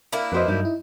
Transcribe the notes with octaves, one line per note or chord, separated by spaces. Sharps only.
A#3 D4 E4
F2 F#4 B4 C5 D#5
G2 F#3 D#4
E4